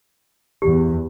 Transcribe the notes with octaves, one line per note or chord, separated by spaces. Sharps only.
E2 G4